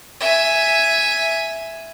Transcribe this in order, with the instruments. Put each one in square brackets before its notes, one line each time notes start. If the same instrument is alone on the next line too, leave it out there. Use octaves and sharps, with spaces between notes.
[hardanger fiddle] E5 G#5